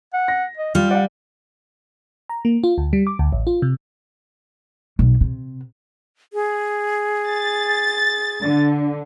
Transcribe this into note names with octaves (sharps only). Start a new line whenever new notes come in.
F#5
A#6
D#5
G3 F4 F6
D5 F5 F#5
A#5
A#3
F4
D2
G3
D6
D2
A1
F4
C3
B1
C3
G#4
A6
D3